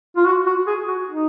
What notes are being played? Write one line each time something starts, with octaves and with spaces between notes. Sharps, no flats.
F4
F#4
F#4
G#4
F#4
D#4